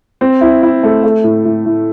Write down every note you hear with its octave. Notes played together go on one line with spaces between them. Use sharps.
C4
E4
E4
A3
A3
A2
A2
A2